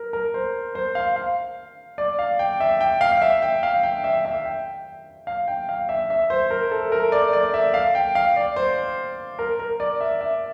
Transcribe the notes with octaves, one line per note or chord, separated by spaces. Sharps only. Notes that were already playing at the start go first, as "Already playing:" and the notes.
Already playing: A#4
A#4
C5
C5
F5
F5
D5
F5
G5
E5
G5
F5
F5
E5
G5
F5
G5
E5
E5
G5
F5
G5
F5
E5
E5
C5
A#4
A4
A#4
D5
D5
E5
F5
G5
F5
D5
C5
A#4
A#4
D5
E5
E5